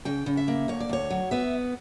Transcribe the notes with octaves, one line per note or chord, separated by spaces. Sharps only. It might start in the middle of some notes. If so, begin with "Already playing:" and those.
C#3 G5
C#3
E5
A#3
D2 C#5
D5
D2 C#5
F#3
B3 E5